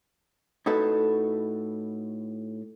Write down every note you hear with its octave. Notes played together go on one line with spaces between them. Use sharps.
A2 D#4 F#4 A4 B4